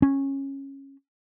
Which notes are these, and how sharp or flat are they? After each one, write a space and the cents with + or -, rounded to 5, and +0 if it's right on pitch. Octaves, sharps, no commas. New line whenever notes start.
C#4 -15